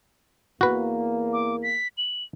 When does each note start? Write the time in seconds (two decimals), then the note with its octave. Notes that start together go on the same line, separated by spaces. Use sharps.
0.61 E2 A#3 F#4 B4
1.33 D6
1.63 B6
1.98 F#7